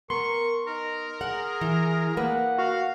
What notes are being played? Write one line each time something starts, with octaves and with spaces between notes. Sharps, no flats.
B3 A#4 C6 C#6
D#4 A#4
G#4 F#5
E3
A#3 B4 F#5
F#4 F5